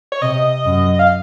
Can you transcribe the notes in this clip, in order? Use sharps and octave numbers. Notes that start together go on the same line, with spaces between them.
C#5
C3 D#5
F#2
F5